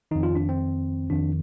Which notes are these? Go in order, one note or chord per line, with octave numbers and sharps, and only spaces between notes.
F2 D#3 D#4
F4
D4
C4
F2 D#3 D4